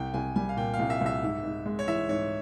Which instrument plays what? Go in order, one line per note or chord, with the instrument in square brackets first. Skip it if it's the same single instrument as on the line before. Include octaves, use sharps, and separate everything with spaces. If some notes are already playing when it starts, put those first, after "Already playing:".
Already playing: [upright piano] C2 [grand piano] G5
[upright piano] C2 [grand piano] G#5
[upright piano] G3 [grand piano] G#5
[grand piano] F5
[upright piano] A#2 [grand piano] G5
[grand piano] F5
[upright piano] C2
[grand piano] E5
[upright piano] C2 [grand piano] E5
[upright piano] G#2
G#2
G#3
[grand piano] C#5
[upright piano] E3 [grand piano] E5
[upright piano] G#2 [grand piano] C#5